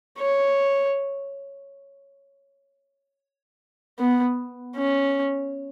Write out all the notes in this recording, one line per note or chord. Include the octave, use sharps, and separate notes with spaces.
C#5
B3
C#4